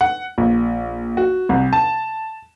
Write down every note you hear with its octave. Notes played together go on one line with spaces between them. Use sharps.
F#5
A#1
F#4
C2
A5